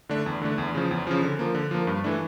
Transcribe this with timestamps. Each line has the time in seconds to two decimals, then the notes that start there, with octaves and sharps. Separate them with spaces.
0.09 D3 A3 D4
0.26 E2
0.41 D3 A3 D4
0.58 E2
0.75 C#3 F3
0.91 E2
1.07 C#3 F3
1.23 D3
1.39 F3 A#3
1.55 D3
1.71 F3 A#3
1.87 G2
2.04 E3 A3 D4